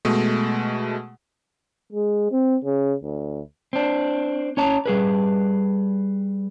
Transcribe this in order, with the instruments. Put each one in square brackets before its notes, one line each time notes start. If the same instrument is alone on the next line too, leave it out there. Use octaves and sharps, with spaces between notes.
[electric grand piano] B2 G#3 A3
[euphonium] G#3
C4
C#3
D2
[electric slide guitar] C4 D4
C#4 C#5 A5 A#5
G3 G#4 B4